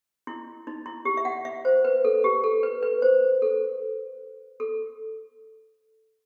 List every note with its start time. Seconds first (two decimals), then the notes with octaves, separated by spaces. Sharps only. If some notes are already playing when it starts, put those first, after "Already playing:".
0.27 E4
0.67 D#4
0.86 E4
1.05 G4
1.17 E5
1.25 F#5
1.45 E5
1.65 C5
1.85 B4
2.05 A4
2.24 G4
2.44 A4
2.63 B4
2.83 B4
3.02 C5
3.42 A4
4.60 A4